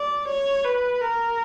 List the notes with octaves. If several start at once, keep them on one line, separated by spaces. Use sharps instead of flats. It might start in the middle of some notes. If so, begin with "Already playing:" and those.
Already playing: D5
C#5
B4
A#4